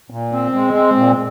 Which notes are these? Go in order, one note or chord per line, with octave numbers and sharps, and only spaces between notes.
A#2
C4
G#3
C4
A#2